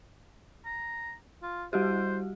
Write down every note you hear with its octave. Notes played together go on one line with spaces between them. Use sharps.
A#5
F4
G3 F#4 G4 C5